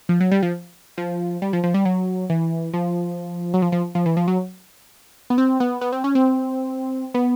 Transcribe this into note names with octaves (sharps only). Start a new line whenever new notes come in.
F3
F#3
G3
F3
F3
G3
F3
F3
G3
F#3
E3
F3
F#3
F3
F3
F3
E3
F3
F#3
B3
C4
B3
B3
C4
C#4
C4
B3